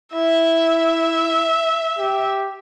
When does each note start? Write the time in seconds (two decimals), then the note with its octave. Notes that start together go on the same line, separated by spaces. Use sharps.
0.14 E4 E5
1.99 G4